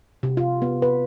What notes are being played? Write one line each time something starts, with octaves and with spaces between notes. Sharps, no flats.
C3
F4
B3
B4